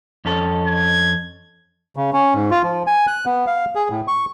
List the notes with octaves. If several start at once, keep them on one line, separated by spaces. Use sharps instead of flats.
F2 C#4 A4
G#6
C#3
C#4
G#2
F4
F3
G#5
F#6
B3
F5
G#4
A2
C#6